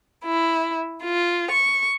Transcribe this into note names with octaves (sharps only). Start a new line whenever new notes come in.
E4
F4
C#6